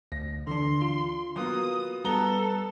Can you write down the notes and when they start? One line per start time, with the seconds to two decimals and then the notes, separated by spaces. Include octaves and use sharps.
0.12 D2 A#6
0.47 D3 E3 D4 C6
0.82 F4
1.36 F#3 A#3 B3 D#6
2.05 G3 B3 A4 A#5 G7